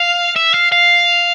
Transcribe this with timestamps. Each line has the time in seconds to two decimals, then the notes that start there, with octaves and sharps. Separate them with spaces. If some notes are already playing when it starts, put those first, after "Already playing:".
Already playing: F5
0.36 E5
0.54 F5
0.72 F5